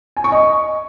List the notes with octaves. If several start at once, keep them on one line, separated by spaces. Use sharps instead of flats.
G#5
C#6
D#5